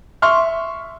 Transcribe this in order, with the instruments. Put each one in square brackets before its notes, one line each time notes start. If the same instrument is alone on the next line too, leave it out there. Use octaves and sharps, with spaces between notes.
[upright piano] E5 C6 C#6 F6